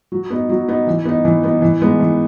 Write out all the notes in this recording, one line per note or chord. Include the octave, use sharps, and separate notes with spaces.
F#3
B3 D#4
F#3
B3 D#4
E3
B3 D#4
E3
B3 D#4
E3
G#3 B3 D#4
E3